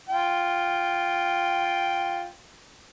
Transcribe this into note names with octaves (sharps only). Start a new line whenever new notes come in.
F4 G5